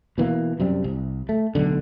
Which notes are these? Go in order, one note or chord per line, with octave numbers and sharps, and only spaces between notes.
B2 E3 A#3
F#2 C3 G3
C2
A3
D1 B1 D3